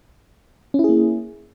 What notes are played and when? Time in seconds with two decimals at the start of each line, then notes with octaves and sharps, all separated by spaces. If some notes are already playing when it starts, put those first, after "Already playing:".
0.74 C#4
0.79 E4
0.84 G#4
0.89 A#3